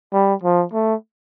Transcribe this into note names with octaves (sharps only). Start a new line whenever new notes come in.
G3
F3
A3